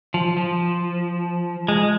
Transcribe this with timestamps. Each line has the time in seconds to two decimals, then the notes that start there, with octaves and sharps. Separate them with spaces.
0.14 F3
0.37 F3
1.69 G#3